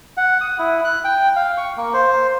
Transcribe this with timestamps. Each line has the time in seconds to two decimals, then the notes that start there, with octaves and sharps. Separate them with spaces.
0.17 F#5
0.41 D#6
0.59 E4
0.84 F#6
1.04 G5
1.36 F5
1.57 C#6
1.77 A#3
1.94 C5